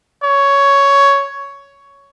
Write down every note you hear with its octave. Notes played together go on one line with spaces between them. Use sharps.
C#5